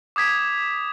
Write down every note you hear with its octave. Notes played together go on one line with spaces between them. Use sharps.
D6 D#6 G#6 B6